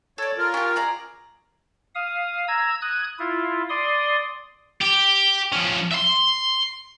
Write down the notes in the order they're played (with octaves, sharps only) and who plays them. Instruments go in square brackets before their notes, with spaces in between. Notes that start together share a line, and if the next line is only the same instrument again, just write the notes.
[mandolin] A4 D5 [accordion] C#5
[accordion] F4 A#4
[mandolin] C#4 G4
G#4 D5 A#5
[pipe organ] F5 D#6
A#5 E6 G#6
D#6 F#6 G#6
E4 F4
D5 C6 D#6
[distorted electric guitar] G4
F3 C#4
E5 C6